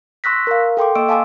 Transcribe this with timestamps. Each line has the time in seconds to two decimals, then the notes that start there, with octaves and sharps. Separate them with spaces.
0.24 C6 C#6 E6 F#6 A#6 B6
0.47 A#4 F5
0.77 A4 G5 C6 D6
0.95 A#3 D#5 C#6 E6 D7
1.09 F5 G#5 A5 C6 D6 E6